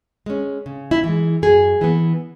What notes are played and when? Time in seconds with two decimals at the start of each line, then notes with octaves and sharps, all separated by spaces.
0.26 G#3 C#4
0.66 C#3
0.91 E4
1.04 E3 G#3
1.42 F#2 G#4
1.81 E3 B3